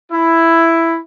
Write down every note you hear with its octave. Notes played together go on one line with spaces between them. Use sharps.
E4